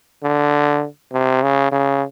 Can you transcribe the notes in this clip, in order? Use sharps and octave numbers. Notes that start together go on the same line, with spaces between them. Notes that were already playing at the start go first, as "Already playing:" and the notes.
D3
C3
C#3
C#3